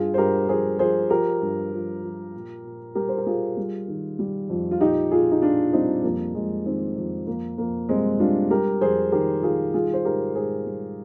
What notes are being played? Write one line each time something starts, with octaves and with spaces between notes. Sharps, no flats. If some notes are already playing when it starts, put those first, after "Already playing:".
Already playing: G2 F4 G#4
C5
G2 G4 A#4
F3 G#4 C5
F3 G#4 C5
F3 G4 A#4
G2
F3
F3
A#2
A#2
G3 G4 A#4
C5
A#4
G3 F4 G#4
G3
D#3
G3
F2
F4
A#2 D#4 G4
A#2 F4 G#4
D#4
A#2 D4 F4
G3 C4 D#4
F2 A#3
F2 G#3
D#3 C4 D#4
F2
F2 A#3
F2 A#3
G3 G#3 C4
G3 D4 F4
G3 G4 A#4
F2 G#4 C5
D#3 G4 A#4
D#3 F4 G#4
G3 F4 G#4
C5
G#2 G4 A#4
G#2 G#4 C5
G3